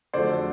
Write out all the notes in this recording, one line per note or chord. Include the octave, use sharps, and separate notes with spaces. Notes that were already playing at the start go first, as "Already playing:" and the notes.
F2 D3 F#3 A3 C5 D5